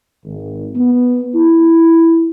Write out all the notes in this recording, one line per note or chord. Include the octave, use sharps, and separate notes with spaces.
G#1
B3
E4